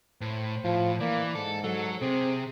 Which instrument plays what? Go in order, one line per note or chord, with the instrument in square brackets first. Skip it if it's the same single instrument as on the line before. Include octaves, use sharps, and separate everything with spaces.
[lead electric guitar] A2 [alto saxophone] C5
[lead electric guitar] A2 [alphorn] F3
[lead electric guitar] E3 [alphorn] A#3 [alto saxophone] D5
[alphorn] G#2 [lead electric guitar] A4
[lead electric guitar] F#3 [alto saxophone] A4
[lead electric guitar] C3 [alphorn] C4 [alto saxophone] G#4